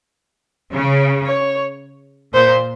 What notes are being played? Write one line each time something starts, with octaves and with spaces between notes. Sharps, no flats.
C#3
C#5
A#2 C5